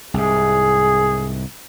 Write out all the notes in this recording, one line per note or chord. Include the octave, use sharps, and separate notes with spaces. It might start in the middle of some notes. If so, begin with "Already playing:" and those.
C2 G#2 G#4